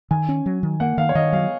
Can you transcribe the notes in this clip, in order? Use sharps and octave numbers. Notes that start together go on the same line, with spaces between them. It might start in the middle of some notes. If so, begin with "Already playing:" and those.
D#3 G#5
C#4
F#3
D#3
A#3 F#5
D#3 F5
C#5
D#3 D#5
F#3 F5